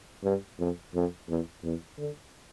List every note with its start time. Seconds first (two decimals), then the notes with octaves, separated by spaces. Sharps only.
0.23 G2
0.59 F2
0.94 F2
1.29 E2
1.63 E2
1.98 D3